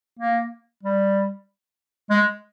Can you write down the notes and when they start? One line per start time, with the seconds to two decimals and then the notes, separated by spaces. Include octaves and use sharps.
0.19 A#3
0.83 G3
2.10 G#3